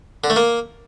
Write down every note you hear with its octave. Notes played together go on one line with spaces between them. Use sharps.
D3
A3
A#3